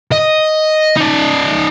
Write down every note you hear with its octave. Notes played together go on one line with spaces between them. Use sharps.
D#5
D#4 D5